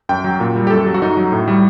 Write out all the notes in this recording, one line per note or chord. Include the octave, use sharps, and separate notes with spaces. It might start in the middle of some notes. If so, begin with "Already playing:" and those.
F#2 G5
F#3
A#2
G3
G4
F#2 A4
F#3
F#4
F#2 D#4
F#3
A2
G3